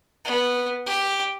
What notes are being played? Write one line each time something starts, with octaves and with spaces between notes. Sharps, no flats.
B3
G4